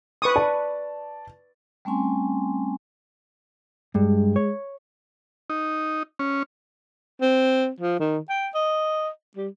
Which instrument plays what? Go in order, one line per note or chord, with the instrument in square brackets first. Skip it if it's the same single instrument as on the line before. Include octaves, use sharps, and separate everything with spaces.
[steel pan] B4 C#6 D#6
[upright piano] D5 A5
[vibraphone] G3 A3 C4 C#4 G#5 C6
[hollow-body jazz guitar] G2 [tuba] G#3
[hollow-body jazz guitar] C#5
[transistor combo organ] D#4
C#4
[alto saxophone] C4
F3
D#3
G5
D#5
G3